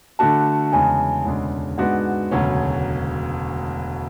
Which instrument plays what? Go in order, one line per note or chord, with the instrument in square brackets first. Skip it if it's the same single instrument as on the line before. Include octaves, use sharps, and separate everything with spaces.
[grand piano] D3 A3 D4 F#4 [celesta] A5
[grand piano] E2 C#3 G#3 [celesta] G#5
[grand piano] E1 D2 C#3 G#3 D4
[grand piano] G#2 G#3 B3 D4 F#4 [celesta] F#5
[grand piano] E1 D2 C#3 F#3 C#4